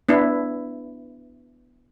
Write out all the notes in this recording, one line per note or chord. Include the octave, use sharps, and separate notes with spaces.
B3 D4 E4